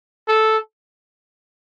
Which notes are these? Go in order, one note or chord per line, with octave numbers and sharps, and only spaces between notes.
A4